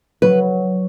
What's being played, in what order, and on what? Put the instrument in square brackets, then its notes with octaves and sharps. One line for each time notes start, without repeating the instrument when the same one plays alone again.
[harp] F#3 [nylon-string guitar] B4